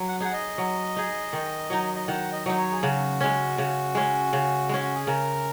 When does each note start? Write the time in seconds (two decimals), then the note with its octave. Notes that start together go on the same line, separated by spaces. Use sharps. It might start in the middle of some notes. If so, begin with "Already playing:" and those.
Already playing: F#3
0.08 F#5
0.20 D#4 G#4 F#5
0.33 D#5
0.58 F#3
0.96 D#4 G#4
1.33 D#3
1.70 F#3 D#4
1.96 D#5
2.08 D#3 F#5
2.32 D#5
2.46 F#3 D#4 D#5
2.58 C#5
2.72 G#4
2.83 C#3 F#4
3.21 G#3 C#4
3.58 C#3
3.95 G#3 C#4
4.33 C#3
4.69 G#3 C#4
4.83 F#4
4.95 G#4
5.07 C#3 A#4